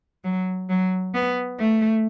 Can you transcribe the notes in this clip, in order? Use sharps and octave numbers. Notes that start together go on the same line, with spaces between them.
F#3
F#3
B3
A3